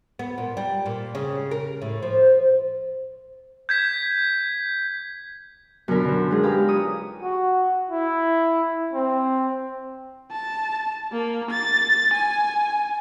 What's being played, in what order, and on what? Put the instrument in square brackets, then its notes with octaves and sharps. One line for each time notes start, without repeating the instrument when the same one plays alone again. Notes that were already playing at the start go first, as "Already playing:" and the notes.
[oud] B3
A#2
G3
A#2
C#3
A#4
A2
F3
[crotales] G6 G#6 B6
[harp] F#2 B2 D3 A#4 B5
D3 C5
G#3 D4 D#4 F4 G#4
G4 B4 F5 A#5 B5
C#5 D#6
[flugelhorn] F#4
E4
C4
[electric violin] A5
A#3
A6
G#5